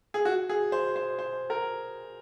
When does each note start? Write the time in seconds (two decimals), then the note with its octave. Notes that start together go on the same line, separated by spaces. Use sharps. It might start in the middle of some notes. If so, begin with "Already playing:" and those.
0.14 G#4
0.25 F#4
0.49 G#4
0.72 C5
0.96 C5
1.19 C5
1.50 A#4